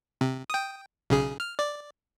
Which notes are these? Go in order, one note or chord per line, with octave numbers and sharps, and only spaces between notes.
C3
G5 D#6
B1 C#3 G#4
F6
D5